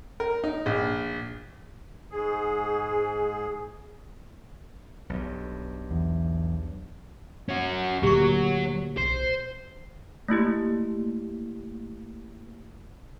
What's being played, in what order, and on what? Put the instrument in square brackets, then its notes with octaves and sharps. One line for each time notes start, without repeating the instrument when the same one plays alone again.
[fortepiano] A#4
D#4
A#1
[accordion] G#2 G#4
[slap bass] B1 G2
[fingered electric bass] E2
[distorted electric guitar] C#4 F#4
[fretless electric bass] D2 A#2 [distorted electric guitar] F#3 [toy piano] G4 C#6
[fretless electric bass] B1 [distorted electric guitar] C5
[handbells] A3 A#3 E4 G4